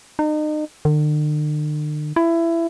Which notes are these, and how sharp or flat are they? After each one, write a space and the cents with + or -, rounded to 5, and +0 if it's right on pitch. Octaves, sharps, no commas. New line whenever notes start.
D#4 -35
D3 +45
E4 +20